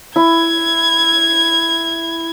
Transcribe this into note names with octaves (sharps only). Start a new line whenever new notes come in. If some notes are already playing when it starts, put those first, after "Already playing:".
E4 G#6